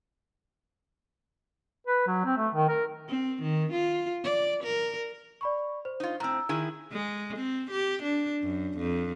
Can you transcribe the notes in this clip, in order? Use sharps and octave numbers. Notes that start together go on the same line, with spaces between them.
B4
F#3
C4
A3
D#3
A#4
C4
D#3
F4
D5
A#4
D5 B5 C#6
C5
D#4 F4
A2 C4 A#5 E6
D#3 E4 G#4
G#3
C4
G4
D4
F#2
F2